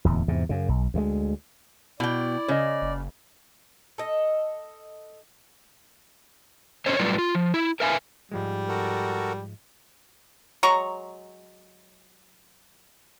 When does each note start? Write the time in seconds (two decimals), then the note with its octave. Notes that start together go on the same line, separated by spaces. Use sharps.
0.05 D1 E2
0.28 E2 G#2 C3
0.49 F#2 C#3
0.69 B1
0.94 D2 C#3 G#3
2.00 B2 E4 D5 G5
2.48 C#3 C#5 D#5
2.82 F#1
3.98 A4 D#5
6.86 C#4 C5 C#5 D#5
6.99 A2 F#3 G3 F4 B4 D5
7.18 F4
7.35 F3
7.54 E4
7.80 A#4 B4 E5 F5 G#5
8.32 G#2 F3 G3 G#3
8.69 F#4 A4 A#4
10.63 F#3 G#3 A#5 C#6